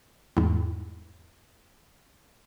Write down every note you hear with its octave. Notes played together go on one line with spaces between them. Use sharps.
E2 G#2